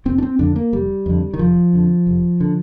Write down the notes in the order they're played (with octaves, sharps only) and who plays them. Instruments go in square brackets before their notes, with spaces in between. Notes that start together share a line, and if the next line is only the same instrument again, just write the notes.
[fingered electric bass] F1 C4
D4
C4
F2 D3 D4
A#3
F1 G3
F2 D3
D#3
F1 F3
F2 D3
F1
D3